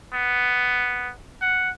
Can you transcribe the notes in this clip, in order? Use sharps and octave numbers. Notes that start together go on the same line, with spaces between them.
B3
F#5